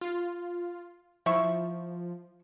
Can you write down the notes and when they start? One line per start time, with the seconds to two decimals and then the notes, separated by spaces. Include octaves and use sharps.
0.01 F4
1.26 F3 E4 E5 C#6